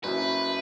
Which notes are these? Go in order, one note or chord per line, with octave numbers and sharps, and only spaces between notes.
F#1 F#2 F#3 E4 B4